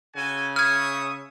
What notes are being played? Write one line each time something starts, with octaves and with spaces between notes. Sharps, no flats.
C#3 F#4 A4 G#5
E5 C#6 D#6 F6 G#6